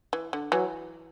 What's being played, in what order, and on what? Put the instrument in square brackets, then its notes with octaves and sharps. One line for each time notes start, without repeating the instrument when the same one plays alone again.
[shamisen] E3
D3
[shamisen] E3 [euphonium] F#3